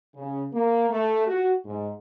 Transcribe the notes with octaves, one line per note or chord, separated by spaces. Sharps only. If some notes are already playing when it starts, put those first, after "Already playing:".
C#3
A#3
A3
F#4
G#2